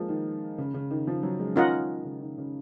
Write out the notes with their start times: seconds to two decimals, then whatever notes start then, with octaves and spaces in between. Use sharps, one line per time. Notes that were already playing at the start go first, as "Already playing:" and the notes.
Already playing: F3 G#3 A#3
0.09 D#3
0.58 C#3
0.74 C#3
0.91 D#3
1.07 F3
1.23 F#3
1.39 G#3
1.55 D#3 C#4 F4 A#4 D#5 F#5
2.04 C#3
2.22 D#3
2.38 C#3